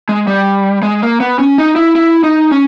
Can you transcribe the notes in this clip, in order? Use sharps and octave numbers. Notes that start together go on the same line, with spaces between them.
G#3
G3
G#3
A#3
B3
C#4
D#4
E4
E4
D#4
C#4